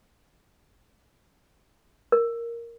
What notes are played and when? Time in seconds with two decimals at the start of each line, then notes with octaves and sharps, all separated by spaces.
2.12 A#4